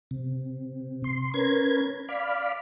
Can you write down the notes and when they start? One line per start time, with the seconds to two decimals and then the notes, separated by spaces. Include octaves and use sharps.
0.11 C3
1.04 C6
1.34 C#4 A#4 B4 G#6
2.09 D5 F5 B5